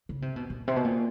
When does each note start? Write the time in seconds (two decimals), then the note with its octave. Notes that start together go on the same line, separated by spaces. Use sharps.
0.09 C#3
0.22 C3
0.36 B2
0.50 A#2
0.68 C3
0.76 B2
0.85 A#2